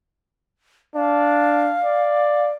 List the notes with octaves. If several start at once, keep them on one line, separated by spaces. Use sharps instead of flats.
D4 F5
D5